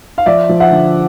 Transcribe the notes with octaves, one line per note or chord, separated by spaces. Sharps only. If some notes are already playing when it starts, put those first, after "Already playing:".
F5
F3 D5 E5
F3
E5 F#5
D3